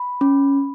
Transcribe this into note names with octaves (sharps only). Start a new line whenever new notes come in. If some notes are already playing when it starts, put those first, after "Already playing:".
Already playing: B5
C#4